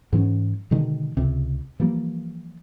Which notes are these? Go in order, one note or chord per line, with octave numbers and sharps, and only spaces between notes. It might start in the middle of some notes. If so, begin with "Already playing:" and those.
G#2 E3 C4 C#4
B2 D3 D#3 G#3
C#2 C3
E3 F3 G3 A#3